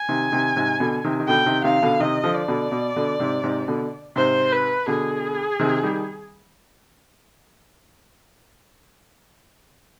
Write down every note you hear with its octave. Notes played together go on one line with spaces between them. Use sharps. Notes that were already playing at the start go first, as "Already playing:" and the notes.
Already playing: G#5
C3 D#3
C3 D#3
G#2 C3
B2 D3
C3 D#3
D#3
B2 D3 G5
C3 D#3
C3 D#3 F5
B2 D3
C3 D#3 D#5
D3 F3
D5
B2 D3
B2
B2 D3
G#2 C3
G#2 C3
B2 D3
G#2 C3 C5
B4
B2 D3 G#4
C3 D#3
D#3 G3